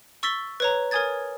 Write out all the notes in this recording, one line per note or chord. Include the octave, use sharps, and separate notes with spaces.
C#6 E6 A6 B6 G7
B4 C#5 A#5
A#4 C#5 G#5 D#6 G#6 A6